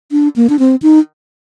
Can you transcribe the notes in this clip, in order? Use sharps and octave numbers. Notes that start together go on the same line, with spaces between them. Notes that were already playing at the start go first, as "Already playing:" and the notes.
D4
A#3
D4
C4
D#4